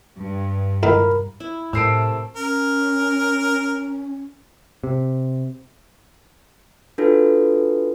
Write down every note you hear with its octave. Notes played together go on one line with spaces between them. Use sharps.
G2
C#2 A2 D#3 A#4 B5
E4
A2 C3 A3 A#4 E6 C7 D7
C#4 A#4
C3
D4 F4 F#4 A4 B4